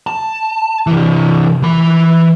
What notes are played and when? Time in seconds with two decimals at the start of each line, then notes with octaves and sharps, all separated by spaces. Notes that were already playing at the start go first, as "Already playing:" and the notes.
0.07 A5
0.87 C3 E3
1.62 E3 B5